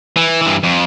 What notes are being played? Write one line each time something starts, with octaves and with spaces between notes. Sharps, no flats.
E3
G2 E3
F2